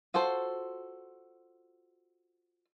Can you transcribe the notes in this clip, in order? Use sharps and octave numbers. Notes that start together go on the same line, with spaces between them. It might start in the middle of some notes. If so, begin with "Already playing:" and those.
F4 F#4 A4 C5